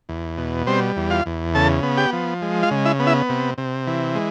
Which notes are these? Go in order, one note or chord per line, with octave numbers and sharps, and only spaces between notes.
E2
B2
G3 C4 C5
E2
F4 F5
E2
C#3 A4 A5
B3
G4 G5
F3
G#3
F4 F5
C#3
E4 E5
B3
E4 E5
C3
C3
E3
G#3